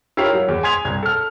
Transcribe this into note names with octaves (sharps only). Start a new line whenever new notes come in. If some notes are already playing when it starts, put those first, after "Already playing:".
E4 F4 G4 A#4 C#5 F5
F#3
E2
G#5 C6 D#6 G#6 B6 F7
C2 G#6
A4 F6